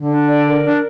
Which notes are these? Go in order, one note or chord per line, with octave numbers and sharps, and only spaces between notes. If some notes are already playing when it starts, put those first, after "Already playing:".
Already playing: D3
D4
D5
A#4
D4